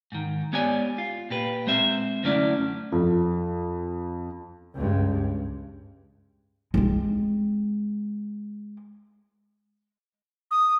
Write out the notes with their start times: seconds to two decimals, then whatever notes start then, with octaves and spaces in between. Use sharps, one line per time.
0.12 G#2 D#3
0.53 G#3 B3 G4 C#5 D5 G#5
0.98 F4
1.30 A#2 G4 B4
1.67 G#3 C4 C5 E5
2.23 F#2 D3 A3 C#4 E4 D5
2.92 F2
4.74 C#2 G2
5.11 G2
6.74 G#3 C4
10.51 D#6